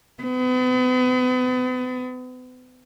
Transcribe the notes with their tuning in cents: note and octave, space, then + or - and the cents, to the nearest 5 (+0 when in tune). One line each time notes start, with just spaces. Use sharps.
B3 +40